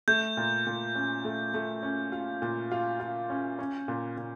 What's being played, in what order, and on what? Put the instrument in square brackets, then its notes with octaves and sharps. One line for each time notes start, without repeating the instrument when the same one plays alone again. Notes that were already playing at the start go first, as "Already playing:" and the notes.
[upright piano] A3 [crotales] G6
[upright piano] A#2
A#2
C#4
A3
A3
C#4
F4
A#2
F4
F4
C#4
C#4
A#2
A#2